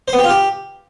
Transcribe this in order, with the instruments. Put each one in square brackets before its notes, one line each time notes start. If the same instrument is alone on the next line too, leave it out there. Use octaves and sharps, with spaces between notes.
[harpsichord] C5
B3
G4
F4
G4